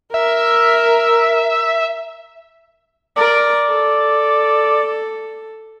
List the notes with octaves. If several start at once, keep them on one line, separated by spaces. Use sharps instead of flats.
A#4 E5
A#4 D5
A4